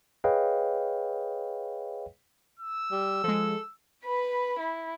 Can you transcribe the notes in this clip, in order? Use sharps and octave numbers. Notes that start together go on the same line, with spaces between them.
G#4 B4 C#5 D#5 F5 G5
E6
G3
F3 G#3 A4
B4 B5
E4